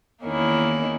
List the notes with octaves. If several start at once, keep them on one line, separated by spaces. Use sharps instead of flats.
E2 D#3 A#3 C#4 E4